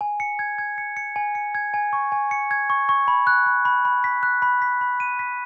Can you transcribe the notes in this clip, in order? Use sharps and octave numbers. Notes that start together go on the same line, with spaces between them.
G#5
C#7
G#6
G#6
C#7
C#7
G#5
C#7
G#6
G#5
C#6
G#5
C#7
G#6
C#6
C#6
B5
F#6
B5
B5
B5
B6
F#6
B5
B6
B5
D#7
B6